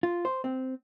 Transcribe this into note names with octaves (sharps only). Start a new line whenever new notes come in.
F4
C5
C4